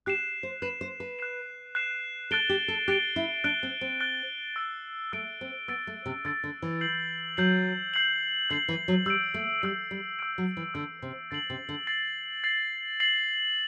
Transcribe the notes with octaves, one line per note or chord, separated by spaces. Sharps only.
G4 F#6 C7 E7
C5
B4 F#6 C7 E7
C5
B4
F#6 C7 E7
F#6 C7 E7
A4 F#6 A6 D7 G7
G4
A4
G4 F#6 A6 D7 G7
E4
D4 F#6 A6 D7 G7
C4
C4
F#6 A6 D7 G7
E6 A6 D7
A3 E6 A6 D7
C4
B3 E6 A6 D7
A3
C3
D3 E6 A6 D7
D3
E3
G6 C7 F#7
F#3 G6 C7 F#7
G6 C7 F#7
D3 G6 C7 F#7
E3
F#3
G3 E6 G6 D7
A3
G3 E6 G6 D7
G3
E6 G6 D7
F#3
E3
D3 E6 G6 D7
C3
D3 A6 C7 F#7
C3
D3
A6 C7 F#7
A6 C7 F#7
A6 C7 F#7